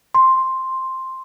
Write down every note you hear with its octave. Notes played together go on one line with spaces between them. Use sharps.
C6